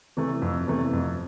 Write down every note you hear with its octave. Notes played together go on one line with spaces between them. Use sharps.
C3 E3 A3
F2
C3 E3 A3
F2